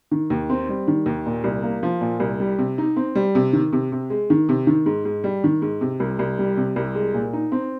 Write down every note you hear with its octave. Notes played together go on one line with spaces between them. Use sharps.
D#3
D#2
C4
G3
D#3
D#2
A#2
C2
A#3
F3
A#2
C2
G3
C3
D#4
C4
G3
C3
D#3
C3
C3
G#3
D#3
C3
D#3
G#2
G#2
G3
D#3
G#2
C3
C2
C2
G3
C3
C2
G#3
A#2
D#4
C4